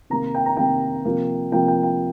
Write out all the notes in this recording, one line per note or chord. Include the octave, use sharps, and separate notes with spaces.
C3 D#3 A#3 A#5
G5
A#5
C3 D#3 A#3 G5
C3 F3 A#3
C3 F3 A#3 G5
G5
G5